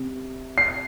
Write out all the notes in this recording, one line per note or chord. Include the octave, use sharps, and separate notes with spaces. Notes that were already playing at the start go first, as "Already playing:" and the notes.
Already playing: C3
C7